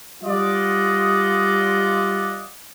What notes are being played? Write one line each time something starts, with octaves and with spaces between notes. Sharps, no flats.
G3 F4 D5 D#5 F#5